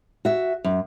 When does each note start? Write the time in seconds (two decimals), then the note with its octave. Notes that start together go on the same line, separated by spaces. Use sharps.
0.25 F#4 E5
0.64 F#2